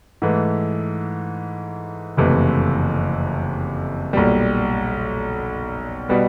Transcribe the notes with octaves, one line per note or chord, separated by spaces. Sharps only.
G#2 E3 A3
F#1 F2 C3 E3 A3
B1 A#2 G3
B2 G3 B3